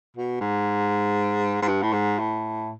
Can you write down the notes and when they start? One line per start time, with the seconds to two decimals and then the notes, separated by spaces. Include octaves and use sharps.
0.17 B2
0.41 G#2
1.62 G#2
1.68 G2
1.82 A2
1.93 G#2
2.19 A2